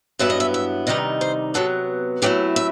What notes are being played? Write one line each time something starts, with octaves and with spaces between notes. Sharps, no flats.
G2 F#3 B3 E4 E5
D#5
E5
E5
C3 D#3 G3 D#4 D#5
C5
C3 F#3 B3 A4
C3 F#3 A3 E4 G4
E5